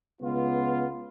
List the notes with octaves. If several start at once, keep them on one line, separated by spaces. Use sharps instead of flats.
C#2 B3 F4